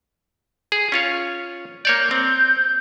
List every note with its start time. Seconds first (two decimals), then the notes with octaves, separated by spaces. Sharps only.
0.72 G#4
0.92 C#4 F4 C#5
1.85 A#3 C#5 D5 G6
2.11 C4